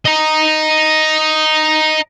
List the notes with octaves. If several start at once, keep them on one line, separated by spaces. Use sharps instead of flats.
D#5 A#5